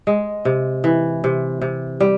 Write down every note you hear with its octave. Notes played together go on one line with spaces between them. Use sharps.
G#3
C3
E3
C3
C3
G3